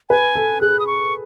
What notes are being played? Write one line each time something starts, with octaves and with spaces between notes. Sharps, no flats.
B4 G#5
A4
G#4 F#6
D#6
C#6